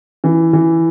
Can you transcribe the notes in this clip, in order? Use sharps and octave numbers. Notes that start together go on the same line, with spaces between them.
E3
E3